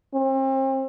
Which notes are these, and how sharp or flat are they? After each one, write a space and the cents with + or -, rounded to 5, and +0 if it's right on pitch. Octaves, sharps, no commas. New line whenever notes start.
C4 +35